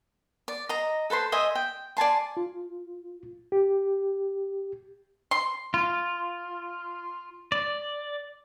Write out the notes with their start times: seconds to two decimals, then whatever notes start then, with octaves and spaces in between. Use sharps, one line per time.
0.48 D5
0.69 D#5 A#5
1.10 A4 B4 C5 C6
1.32 C5 D#5 E5 G#5
1.55 G5
1.97 D5 G#5 A5 C6
2.37 F4
3.52 G4
5.31 C6
5.74 F4
7.52 D5